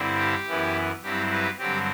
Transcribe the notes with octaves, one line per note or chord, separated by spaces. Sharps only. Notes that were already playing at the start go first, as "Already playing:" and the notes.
Already playing: G2 D3 G3 C4 E4
G4
F#2 E3 B3 E4
G2 F#3 C4 E4 G4
G4 B4
G2 D3 F#3 C4 G4